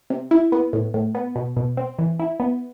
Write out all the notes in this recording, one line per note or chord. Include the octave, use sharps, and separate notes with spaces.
C3
E4
B3
A2
A2
B3
B2
B2
C4
E3
E4
B3